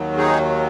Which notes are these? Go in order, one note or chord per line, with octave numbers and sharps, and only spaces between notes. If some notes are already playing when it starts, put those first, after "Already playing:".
Already playing: D#2 D#3 F#3
D#4 G#4